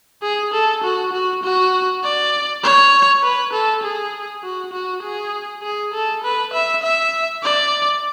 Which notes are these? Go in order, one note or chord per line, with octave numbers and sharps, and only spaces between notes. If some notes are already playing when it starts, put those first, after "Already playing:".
G#4
A4
F#4
F#4
F#4
D5
C#5
B4
A4
G#4
F#4
F#4
G#4
G#4
A4
B4
E5
E5
D5